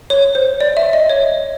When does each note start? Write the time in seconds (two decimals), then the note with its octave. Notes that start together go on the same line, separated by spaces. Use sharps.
0.10 C#5
0.35 C5
0.60 D5
0.77 E5
0.93 D#5
1.10 C#5